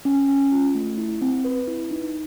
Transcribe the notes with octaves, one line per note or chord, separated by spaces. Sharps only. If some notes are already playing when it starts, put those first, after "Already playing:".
C#4
C#4
F4
A3
E4
C4
B4
E4
D#4